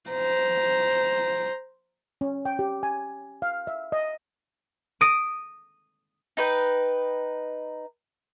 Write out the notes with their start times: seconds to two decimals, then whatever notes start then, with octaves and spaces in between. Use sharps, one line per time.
0.10 C5 A#5
2.21 C#4
2.45 G5
2.59 G4
2.83 G#5
3.42 F5
3.67 E5
3.92 D#5
5.01 D#6 A#6 D7 D#7
6.37 D#4 B4 G5